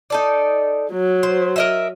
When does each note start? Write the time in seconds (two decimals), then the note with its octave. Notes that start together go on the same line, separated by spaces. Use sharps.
0.10 D#4 A4 D5
0.92 F#3
1.23 C5
1.56 A#4 D#5 E5